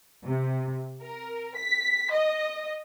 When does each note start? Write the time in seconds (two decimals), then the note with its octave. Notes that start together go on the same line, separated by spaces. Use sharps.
0.25 C3
1.02 A#4
1.56 B6
2.13 D#5